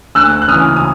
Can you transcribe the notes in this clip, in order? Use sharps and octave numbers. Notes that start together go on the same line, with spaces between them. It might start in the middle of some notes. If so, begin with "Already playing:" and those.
D2 E6 F#6
F#6
C#3 E3 D#6 F6
D#6